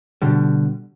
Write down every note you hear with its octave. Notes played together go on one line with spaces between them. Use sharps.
B2 D3 G3